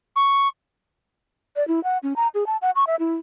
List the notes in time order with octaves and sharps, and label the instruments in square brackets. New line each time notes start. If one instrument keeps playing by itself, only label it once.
[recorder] C#6
[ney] D5
E4
F#5
C#4
A#5
G#4
A5
F#5
C#6
E5
E4